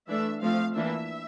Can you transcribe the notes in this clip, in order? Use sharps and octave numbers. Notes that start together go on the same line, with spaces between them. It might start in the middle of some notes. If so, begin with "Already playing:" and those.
E3 A3 D4 E5
F3 A3 C4 F5
E3 A#3 D4 E5